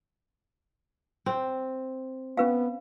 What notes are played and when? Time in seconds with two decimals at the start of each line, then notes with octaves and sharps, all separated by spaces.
1.26 C4
2.37 B3 C#4 B4 F5